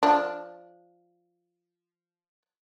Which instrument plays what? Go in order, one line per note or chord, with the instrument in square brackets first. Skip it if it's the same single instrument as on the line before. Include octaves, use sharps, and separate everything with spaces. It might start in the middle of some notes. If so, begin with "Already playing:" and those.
[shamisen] F3 D4